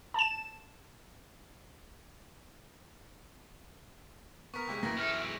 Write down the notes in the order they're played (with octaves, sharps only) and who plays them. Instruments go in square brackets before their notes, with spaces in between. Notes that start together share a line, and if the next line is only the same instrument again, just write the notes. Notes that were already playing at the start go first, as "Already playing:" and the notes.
[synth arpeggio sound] A5 E7
[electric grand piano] B3 A#4 [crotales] C#6 B6
[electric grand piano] D#2 C3 G#3
[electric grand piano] F#2 E3 G5 [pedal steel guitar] A#3 [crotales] A#6
[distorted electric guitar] E2 A4 [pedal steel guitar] E5 F6
[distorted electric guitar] B1
[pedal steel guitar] G#3 G#4 E6